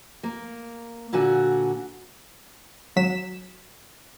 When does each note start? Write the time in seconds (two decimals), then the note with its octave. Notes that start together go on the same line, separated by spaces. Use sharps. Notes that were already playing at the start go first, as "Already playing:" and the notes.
0.23 A#3
1.13 A#2 D3 F#4 G#5
2.96 G#1 F#3 B6 E7